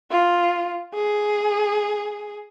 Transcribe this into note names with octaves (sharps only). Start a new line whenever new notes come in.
F4
G#4